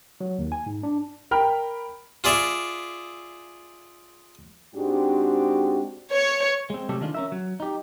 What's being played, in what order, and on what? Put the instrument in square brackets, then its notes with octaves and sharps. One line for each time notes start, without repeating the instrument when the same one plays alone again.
[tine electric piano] F#3
D#2
G#5
G#2
D4
[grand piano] A#4 G5 B5 F6
[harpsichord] F4 G#4 D5 E5
[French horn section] G#2 G#3 C4 D4 F#4 G4
[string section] C#5
[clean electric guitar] G#3 C4
C3 F#3 G3 A3 G4 A4
D#3 F3 G#3 D4 F4
C#4 A#4 E5
F#3
D#4 G4